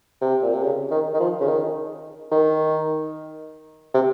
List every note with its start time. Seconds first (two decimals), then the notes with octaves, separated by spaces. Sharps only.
0.21 C3
0.42 A#2
0.53 C3
0.63 C#3
0.91 D#3
1.14 D#3
1.20 F3
1.41 C#3
1.47 D#3
2.31 D#3
3.94 C3